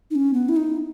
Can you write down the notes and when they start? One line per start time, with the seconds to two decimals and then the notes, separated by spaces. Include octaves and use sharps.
0.11 D#4
0.15 C#4
0.34 B3
0.49 E4
0.56 D#4